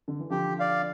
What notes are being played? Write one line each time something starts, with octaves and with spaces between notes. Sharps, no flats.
D3
E3
D3 F3 G4
D5 F5